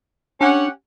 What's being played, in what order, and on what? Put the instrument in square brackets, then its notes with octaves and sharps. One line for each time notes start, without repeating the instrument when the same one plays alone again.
[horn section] C#4 G4 F#5 [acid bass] D4